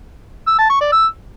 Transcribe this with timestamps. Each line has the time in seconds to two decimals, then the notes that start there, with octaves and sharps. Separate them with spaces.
0.47 E6
0.58 A5
0.70 C#6
0.81 D5
0.92 E6